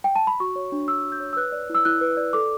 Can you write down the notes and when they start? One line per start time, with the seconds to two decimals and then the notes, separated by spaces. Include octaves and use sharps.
0.04 G5
0.16 A5
0.27 B5
0.40 F#4 C#6
0.56 C#5
0.72 D4
0.88 D4 E6
1.05 F#4
1.12 G6
1.20 C#5
1.33 E6
1.37 B4 F#6
1.52 D5
1.70 E4
1.75 E6
1.85 E4 F#6
2.01 B4
2.17 D5
2.33 A4 D6